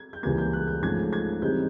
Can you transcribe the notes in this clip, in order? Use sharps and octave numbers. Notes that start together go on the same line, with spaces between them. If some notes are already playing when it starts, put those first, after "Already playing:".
Already playing: G#6
G6
C#2 C#3 E3 G3 A#3 G#6
G6
F#6
G6
G#2 F3 A3 C#4 G#6
G#6
C#3 E3 G3 C4 D#4 G6